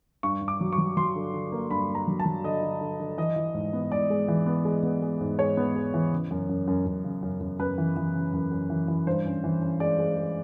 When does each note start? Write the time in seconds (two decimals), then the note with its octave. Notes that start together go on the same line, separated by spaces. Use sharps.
0.23 G2 C#6
0.42 G2
0.48 D6
0.61 F#3
0.73 C#6
0.78 F#3
0.97 F#3 C6
1.16 D3
1.34 D3
1.52 A#3
1.71 G2 B5
1.89 A#3
1.95 A#5
2.07 F#3
2.20 A5
2.26 F#3
2.44 D3 D#5
2.63 D3
2.81 D3
3.00 D3
3.18 E3 D#5
3.36 E3
3.54 G#2
3.73 B3
3.91 G#2 D5
4.10 G#3
4.28 E3
4.46 B3
4.65 G#3
4.83 B3
5.02 G#3
5.21 G#2
5.39 G#3 C#5
5.57 B3
5.75 G#3
5.94 E3
6.12 C#3
6.31 F#2
6.49 F#2
6.67 F#2
6.86 F#2
7.04 C#3
7.23 F#2
7.41 F#2
7.59 F#2 B4
7.78 E3
7.97 E3
8.15 C#3
8.33 F#2
8.52 F#2
8.70 E3
8.88 E3
9.07 G2 C5
9.25 C#4
9.44 E3
9.62 C#4
9.80 G#3 D5
9.98 G#3
10.17 G#3